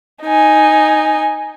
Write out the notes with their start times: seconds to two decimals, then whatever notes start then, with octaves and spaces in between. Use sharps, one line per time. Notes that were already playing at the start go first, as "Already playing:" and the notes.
0.23 D#4 G#5